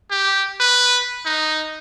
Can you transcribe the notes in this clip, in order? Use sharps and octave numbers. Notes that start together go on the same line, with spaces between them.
G4
B4
D#4